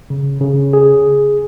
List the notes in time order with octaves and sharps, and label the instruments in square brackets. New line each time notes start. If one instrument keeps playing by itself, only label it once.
[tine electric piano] C#3
C#3
G#4